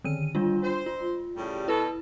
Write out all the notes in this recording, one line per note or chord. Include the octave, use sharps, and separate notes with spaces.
D3 D#3 D#7
G3 D4 F4
C5
F4
A2 C#3 G3
B2 E4 A4 B4